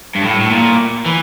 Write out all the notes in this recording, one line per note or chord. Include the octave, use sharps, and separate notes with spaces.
G2
A2
A2
A#2
E3